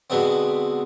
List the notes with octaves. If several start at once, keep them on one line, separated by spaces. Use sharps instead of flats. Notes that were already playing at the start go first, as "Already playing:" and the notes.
B2 D3 G#3 B3 C4